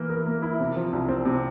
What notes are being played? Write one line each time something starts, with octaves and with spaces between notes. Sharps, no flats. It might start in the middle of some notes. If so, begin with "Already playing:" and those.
Already playing: E3 A#3 E4
A#4
A#3
E4
C3
F3
C2
C4
C3